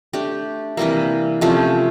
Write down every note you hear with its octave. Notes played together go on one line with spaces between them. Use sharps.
A3 D4 G4
C3 E3 G3 A#3
C3 F3 A3 C#4